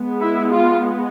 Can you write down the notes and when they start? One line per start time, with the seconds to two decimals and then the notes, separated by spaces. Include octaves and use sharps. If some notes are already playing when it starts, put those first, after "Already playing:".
Already playing: G#3 B3
0.20 E4
0.50 F4